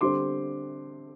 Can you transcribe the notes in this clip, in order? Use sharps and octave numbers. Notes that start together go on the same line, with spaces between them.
D3 G3 C4 C6 D6